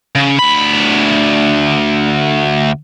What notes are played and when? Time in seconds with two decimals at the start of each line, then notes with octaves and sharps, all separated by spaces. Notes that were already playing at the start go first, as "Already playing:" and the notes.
0.15 C#3
0.39 D2 B5